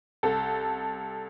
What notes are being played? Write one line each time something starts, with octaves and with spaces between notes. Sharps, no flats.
C2 A4